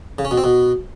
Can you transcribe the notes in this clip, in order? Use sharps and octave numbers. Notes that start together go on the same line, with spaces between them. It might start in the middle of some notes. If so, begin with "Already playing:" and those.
C#3
C#4
B2
C4
B2